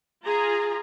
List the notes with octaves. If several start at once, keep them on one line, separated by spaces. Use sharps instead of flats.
F4 G#4 A#5